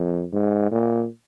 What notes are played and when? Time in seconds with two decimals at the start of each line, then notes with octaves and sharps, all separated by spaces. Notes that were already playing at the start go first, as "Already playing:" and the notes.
Already playing: F2
0.33 G#2
0.72 A#2